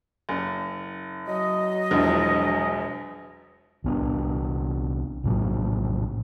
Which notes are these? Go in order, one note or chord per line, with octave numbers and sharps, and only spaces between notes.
F#1
F#3 D#5
E1 A#1 E2
C2 B3 D4
A#1 A2 F#3